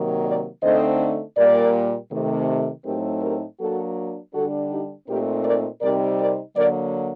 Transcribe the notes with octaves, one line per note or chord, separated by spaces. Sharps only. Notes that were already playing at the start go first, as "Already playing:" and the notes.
Already playing: C3 D#3 F#3 A#3
A#4 D5
D3 A3 C4 D#4 C5 D#5
A#2 G3 A#3 A#4 D5
C3 D#3 A3
A2 F#3 A3 C4 D#4 G4 A#4
G4 A#4
F#3 A#3 D4 F#4 A4
D3 G3 D4 F#4 A4
D#4 G4
A#2 A3 C4 D#4 G4 A#4
A#4 D5
C3 G3 C4 D#4 A#4 D5
A#4 D5
D3 F#3 A#3 A#4 D5